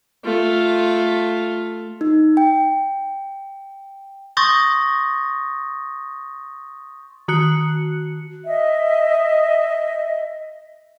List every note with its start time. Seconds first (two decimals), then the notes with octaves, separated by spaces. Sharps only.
0.25 A3 F4
2.01 D#4
2.37 G5
4.37 C6 C#6 D#6 G6 A6 A#6
7.28 D#3 F#4 F#6 C#7
8.45 D#5 E5